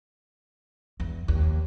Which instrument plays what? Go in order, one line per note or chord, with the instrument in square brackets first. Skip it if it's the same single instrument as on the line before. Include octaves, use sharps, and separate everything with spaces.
[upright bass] E2
D#2